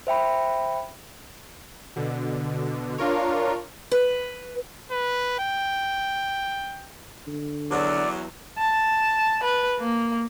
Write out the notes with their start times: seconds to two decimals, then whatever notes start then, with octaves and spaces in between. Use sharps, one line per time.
0.07 C5 E5 G5 B5
1.96 B2 D3
2.98 D4 F4 A#4 C#5
3.91 B4
4.91 B4
5.39 G5
7.27 D3
7.71 E2 F#3 D5
8.59 A5
9.44 B4
9.80 A#3